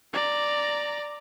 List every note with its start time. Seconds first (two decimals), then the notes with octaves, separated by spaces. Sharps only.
0.13 D5 A#5